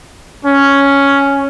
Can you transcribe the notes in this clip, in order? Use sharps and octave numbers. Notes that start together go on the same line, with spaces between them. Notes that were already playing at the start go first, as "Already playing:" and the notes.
C#4